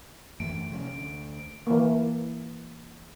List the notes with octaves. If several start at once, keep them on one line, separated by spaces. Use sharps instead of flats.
F#2 E3 A3 D7
C3 F3 C#4
D2
E3 A#3